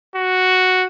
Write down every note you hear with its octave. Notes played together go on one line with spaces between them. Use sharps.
F#4